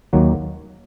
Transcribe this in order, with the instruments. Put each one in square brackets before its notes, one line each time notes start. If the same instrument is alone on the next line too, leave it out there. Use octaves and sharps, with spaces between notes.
[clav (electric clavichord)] D#2 D#3 F#3 A#3 F#4